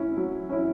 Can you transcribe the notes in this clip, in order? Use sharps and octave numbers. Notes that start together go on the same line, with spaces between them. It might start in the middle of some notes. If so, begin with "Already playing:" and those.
Already playing: C#4 E4
F#3
C#4 E4